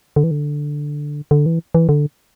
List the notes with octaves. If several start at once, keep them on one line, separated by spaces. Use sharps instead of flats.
D3
E3
D3
D3
E3
E3
D3